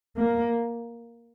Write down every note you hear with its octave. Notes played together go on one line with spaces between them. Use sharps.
A#3